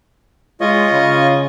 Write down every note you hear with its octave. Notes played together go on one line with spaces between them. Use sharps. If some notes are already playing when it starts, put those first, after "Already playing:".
G#3 F4 C#5 D#5
C#3